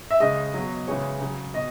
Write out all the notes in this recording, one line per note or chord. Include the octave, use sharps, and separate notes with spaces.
E5
C#3 G#3 D#5
B2 F#3
C#3 E3 G#3 C#5
C#3 F#3
B2 D#5